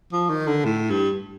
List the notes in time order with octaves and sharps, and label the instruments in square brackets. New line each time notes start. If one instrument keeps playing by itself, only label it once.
[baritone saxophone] F3
D#3
D3
A2
G2